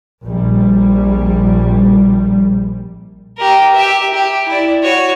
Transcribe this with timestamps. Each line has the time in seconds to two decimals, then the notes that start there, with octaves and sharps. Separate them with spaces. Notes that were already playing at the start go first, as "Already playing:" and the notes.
0.24 A#1 G3
3.37 G4 A#4
3.74 G4 E5
4.14 G4
4.49 E4 D5
4.83 F#4 C#5